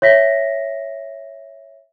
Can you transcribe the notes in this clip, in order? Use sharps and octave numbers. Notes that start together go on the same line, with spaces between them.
C#5 E5 A#6 B6